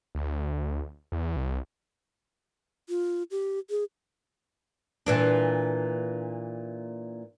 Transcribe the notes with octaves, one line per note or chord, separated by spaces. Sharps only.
D2
E2
C2
F4
G4
G#4
A#2 E3 D4